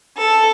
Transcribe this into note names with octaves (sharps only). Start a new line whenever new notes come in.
A4